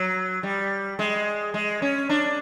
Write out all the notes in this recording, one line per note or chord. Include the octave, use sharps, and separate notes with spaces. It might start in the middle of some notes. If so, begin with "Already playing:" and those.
Already playing: F#3
G3
G#3
G#3
C#4
D4